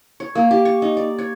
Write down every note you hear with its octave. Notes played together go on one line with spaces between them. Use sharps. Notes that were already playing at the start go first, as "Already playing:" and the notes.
C#5
A#3
G4
C#6
D#4
D5
C#5